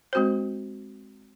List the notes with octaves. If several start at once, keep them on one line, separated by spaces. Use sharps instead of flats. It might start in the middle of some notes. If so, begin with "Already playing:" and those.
G#3 C4 F#4 C5